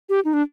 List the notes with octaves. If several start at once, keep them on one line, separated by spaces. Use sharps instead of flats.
G4
D#4
D4